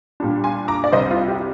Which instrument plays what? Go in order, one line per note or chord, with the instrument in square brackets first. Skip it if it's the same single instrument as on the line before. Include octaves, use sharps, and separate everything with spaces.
[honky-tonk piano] A#2 G3 D4
G#5 C6
A#5 D6
D5
C2 C3 G3 C5 D#5
F4
G4